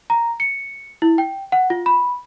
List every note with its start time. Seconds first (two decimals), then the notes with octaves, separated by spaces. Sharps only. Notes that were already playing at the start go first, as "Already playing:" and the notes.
0.10 A#5
0.40 C#7
1.02 E4
1.18 G5
1.52 F#5
1.70 F4
1.86 B5